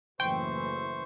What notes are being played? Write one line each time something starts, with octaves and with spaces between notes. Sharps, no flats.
F#1 A2 E3 C5 G5 C#6